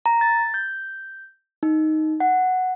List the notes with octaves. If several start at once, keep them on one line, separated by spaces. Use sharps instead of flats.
A#5
A6
G6
D#4
F#5